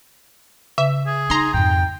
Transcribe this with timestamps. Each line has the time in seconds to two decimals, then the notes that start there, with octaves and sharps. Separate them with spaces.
0.78 C#3 E5
1.07 G#4
1.30 D#4 A#5 C6
1.54 F2 G#2 G5